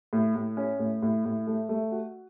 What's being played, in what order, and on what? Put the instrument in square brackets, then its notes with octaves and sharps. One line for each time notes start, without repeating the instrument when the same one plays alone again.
[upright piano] A2
A2
C#4
A2
A2
A2
A3
A3
F#4